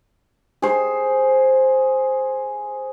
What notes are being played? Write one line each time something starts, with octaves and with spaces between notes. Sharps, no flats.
G#4 C5